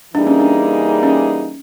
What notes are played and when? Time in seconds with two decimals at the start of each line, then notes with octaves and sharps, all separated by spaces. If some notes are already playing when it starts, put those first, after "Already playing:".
0.14 E3 G3 A#3 D4 D#4 G#4
0.27 C#4
0.40 D4
1.03 C#4